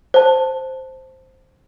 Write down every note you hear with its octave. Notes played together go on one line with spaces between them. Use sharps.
C5 A5